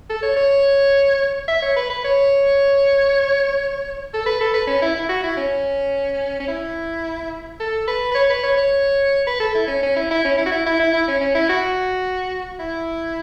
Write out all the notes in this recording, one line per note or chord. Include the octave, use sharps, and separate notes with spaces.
A4
C#5
C#5
E5
C#5
B4
B4
C#5
A4
B4
A4
B4
C#4
E4
E4
F#4
E4
C#4
C#4
E4
A4
B4
B4
C#5
B4
C#5
C#5
B4
A4
E4
C#4
C#4
E4
E4
C#4
E4
F#4
E4
E4
E4
E4
C#4
C#4
E4
F#4
E4